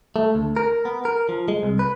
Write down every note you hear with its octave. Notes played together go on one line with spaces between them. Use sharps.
A3
D2
A#4
B3
A#4
F3
G#3
C2
B4